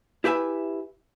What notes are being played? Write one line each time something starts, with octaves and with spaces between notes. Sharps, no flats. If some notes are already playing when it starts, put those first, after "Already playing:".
E4 G4 B4 E5 G#5